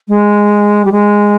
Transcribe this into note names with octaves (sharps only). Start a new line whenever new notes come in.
G#3
G3
G#3